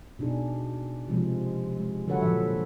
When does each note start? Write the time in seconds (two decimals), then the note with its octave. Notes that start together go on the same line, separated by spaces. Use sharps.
0.19 B2 D4 D#4 G#4
1.08 C3 F3 G#3
1.76 G#3
2.07 D3 F#3 A4 B4 C#5 F#5
2.21 A#2 E3 F3 E5